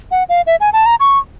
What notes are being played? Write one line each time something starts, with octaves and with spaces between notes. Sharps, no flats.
F#5
F5
E5
G#5
A5
A#5
C#6